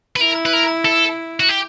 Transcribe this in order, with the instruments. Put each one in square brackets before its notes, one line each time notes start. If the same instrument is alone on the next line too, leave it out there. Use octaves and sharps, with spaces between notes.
[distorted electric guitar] B4
[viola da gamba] E4 [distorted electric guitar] A#4
[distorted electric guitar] B4
A#4
A4
F#4
G4